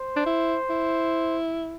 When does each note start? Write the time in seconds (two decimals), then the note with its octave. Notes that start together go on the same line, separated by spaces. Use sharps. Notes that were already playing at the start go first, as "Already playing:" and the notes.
Already playing: C5
0.16 D4
0.26 E4
0.70 E4